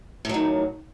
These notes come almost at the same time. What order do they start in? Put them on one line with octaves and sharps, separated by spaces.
A2 F#3 D#3